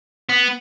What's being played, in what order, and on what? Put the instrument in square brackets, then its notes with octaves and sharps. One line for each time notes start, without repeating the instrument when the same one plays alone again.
[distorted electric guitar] B3